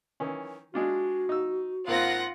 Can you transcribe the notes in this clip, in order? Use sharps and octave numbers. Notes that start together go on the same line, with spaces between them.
D#3 E3 C#4
G#3 D4 F4 F#4
D#4 E6
G#1 A#3 C4 F4 F#5 A#6